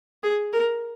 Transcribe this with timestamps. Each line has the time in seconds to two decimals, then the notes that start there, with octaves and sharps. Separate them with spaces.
0.23 G#4
0.53 A#4